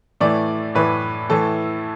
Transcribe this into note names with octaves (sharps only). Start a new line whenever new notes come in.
A2 E3 A3 D5
A2 E3 A3 B4
A2 E3 A3 A4